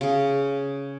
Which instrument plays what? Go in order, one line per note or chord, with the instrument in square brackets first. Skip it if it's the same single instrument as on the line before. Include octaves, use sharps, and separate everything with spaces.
[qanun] C#3 G#4